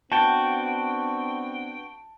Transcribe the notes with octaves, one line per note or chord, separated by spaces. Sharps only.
B3 C4 D4 F#4 G5 A5